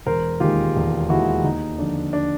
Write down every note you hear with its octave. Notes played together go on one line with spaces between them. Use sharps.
E1 A#4 C5
D#2 D#3 G#3 F4 G4
E1
D#2 D#3 G#3 E4 F#4
D#2 D#4
D3 F3 D4
D4